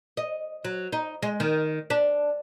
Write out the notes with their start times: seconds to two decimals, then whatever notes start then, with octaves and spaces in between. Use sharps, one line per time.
0.17 D#5
0.65 F#3
0.92 D#4
1.22 G#3
1.40 D#3
1.90 D4